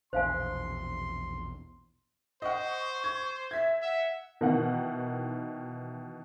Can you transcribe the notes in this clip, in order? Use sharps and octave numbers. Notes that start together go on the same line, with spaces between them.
A#1 E2 B2 C5 F5 G#5 C6
C5 D#5 F#5 C#6
G#6
E5 G#6 B6
E5 F#5
B2 D#3 E3 F#5